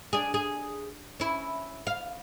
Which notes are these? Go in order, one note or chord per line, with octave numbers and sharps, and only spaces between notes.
D4 G#4
G#4
C#4 E4
F5